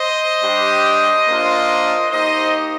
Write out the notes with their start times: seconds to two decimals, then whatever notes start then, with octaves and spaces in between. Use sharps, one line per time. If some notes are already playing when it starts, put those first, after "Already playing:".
Already playing: C5 D#5
0.40 G3 D4 G4
1.26 A#3 D4 F4
2.11 A#3 D#4 G4 C5 D#5